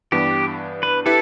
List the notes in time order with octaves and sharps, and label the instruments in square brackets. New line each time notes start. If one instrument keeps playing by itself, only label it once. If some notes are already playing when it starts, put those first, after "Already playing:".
[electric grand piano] G2 E3 B3 D4 [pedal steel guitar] G4
[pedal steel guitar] B4
[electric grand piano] E4 G4 B4 [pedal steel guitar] A4